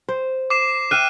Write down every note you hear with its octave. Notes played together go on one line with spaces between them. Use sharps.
C5
D6 C7 E7
E5 F5 G5 F6 F#6 D#7